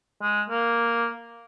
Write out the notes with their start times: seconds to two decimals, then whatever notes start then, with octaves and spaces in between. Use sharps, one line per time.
0.22 G#3
0.50 A#3